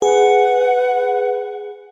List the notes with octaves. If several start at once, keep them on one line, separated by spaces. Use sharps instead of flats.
G#4 B4 F#5